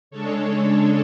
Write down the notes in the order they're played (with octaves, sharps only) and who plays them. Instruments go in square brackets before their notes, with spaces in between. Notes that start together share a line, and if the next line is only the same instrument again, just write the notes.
[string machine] C#3 G#3 D4 A4 C#5